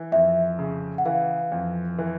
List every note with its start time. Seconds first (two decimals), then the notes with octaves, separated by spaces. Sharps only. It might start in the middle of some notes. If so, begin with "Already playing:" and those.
Already playing: E3
0.12 F2 E5
0.59 C#3
0.98 F#5
1.06 E3 F5
1.52 F2
1.98 E3